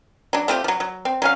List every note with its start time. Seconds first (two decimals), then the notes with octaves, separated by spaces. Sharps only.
0.33 F#3 D4
0.48 A3 C4 F4 G4
0.64 F3 F#3
0.80 F#3
1.05 C4
1.22 F#3 C#4 F5